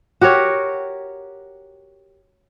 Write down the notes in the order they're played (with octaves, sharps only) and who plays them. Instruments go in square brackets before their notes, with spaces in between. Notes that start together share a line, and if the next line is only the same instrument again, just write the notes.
[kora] F#4 G4 A#4 C#5